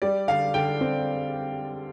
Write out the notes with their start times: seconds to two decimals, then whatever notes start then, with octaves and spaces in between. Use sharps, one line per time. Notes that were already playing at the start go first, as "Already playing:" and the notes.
0.02 G3 D5
0.28 D3 F5
0.54 D3 G5
0.81 C4